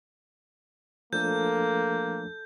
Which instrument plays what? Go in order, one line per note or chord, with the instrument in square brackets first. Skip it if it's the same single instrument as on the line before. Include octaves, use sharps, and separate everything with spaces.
[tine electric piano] F3 A3 D4 [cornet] A#3 [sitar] A4 [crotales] G6